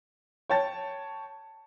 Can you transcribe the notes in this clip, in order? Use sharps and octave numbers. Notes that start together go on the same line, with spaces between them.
C#5 G5 A5 A6